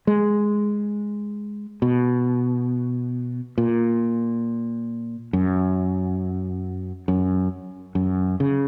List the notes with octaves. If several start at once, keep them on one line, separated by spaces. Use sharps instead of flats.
G#3
B2
A#2
F#2
F#2
F#2
C#3